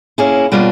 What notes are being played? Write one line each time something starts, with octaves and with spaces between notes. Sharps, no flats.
A#3 C#4 E4 G#4
B2 G3 A#3 D4 F4